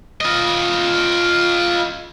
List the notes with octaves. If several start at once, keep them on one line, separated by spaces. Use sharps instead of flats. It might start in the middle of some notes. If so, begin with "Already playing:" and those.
F4 D#5